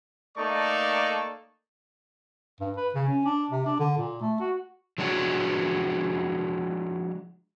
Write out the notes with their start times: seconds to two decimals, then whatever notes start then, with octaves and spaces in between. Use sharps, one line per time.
0.37 A3 A#3 D#4 A4 D5 C#6
2.60 G2
2.77 B4
2.94 C#3
3.08 C#4
3.26 D4
3.50 C3
3.66 D4
3.80 D3
3.98 A#2
4.21 A3
4.40 F#4
4.98 F3 G#3 D4 F4 F#4 C#5